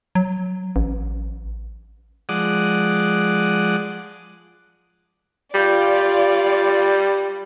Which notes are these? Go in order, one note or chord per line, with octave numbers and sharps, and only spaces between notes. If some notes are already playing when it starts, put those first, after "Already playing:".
F#3
A1
F3 G#3 D5 F#5 D6 D#6
G3 F4 D5